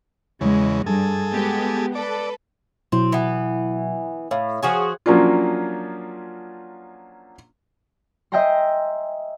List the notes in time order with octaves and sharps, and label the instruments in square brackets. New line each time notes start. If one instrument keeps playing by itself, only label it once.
[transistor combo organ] E2 C#3 [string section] G#3
[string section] G2 [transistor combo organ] G#4 A4
[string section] G#3 B3 G4
[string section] A4 B4 [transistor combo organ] D5
[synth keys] B2 F#3 E4 [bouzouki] C4
[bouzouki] E3 B3
[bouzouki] A2 [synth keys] C#5 F5
[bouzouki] F3 F#4 G#4
[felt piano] F3 F#3 A#3 C#4 D4 F4
[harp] D#5 E5 G5 G#5 A#5 C6